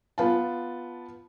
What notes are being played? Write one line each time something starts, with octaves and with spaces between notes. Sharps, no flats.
B3 F4 A5